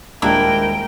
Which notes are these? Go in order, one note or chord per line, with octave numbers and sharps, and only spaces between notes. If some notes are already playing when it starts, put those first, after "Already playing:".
D#1 G#3 A#3 D4 E4 A#4 G5